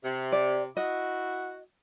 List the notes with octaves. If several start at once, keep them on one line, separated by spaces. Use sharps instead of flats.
C3
D5
E4 F#4 D#5